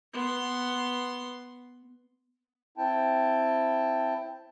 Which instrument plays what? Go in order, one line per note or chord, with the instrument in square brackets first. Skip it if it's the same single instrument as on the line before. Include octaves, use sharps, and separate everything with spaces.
[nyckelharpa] B3 C6
[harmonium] C4 E4 G5 A5